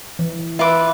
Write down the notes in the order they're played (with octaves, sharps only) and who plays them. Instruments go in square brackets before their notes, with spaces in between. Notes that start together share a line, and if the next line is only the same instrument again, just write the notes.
[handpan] E3
[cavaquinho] F4 B4 D6 [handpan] E5